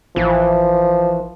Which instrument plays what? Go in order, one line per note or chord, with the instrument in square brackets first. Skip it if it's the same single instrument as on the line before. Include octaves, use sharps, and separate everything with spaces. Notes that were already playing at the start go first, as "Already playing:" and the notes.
[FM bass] A1 [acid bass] E3 [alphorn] F3